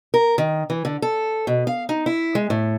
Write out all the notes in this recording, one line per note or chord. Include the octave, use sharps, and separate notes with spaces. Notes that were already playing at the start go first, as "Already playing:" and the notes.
A#4
D#3
E3
D3
A4
B2
F5
D#4
E4
G#3
A2